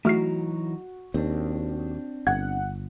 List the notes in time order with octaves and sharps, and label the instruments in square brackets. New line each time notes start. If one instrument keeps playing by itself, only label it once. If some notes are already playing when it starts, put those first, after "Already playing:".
[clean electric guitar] E3 F#3 D#4 [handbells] A3 F6 C7 [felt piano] F#4
[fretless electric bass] D#2 [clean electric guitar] C4 D4
[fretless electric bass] G1 [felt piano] F#5 [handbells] G#6